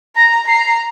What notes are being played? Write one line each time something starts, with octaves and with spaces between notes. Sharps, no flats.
A#5 A#6
A#5 C7
C7